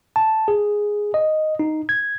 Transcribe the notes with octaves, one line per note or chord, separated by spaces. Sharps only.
A5
G#4
D#5
D#4
G#6